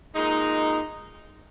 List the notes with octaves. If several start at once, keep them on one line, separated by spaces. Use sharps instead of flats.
A#2 G#3 D#4